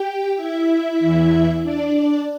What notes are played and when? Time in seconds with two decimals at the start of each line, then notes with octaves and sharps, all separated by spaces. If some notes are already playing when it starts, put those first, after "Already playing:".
Already playing: G4 G5
0.36 E4 E5
1.00 E2 E3
1.62 D4 D5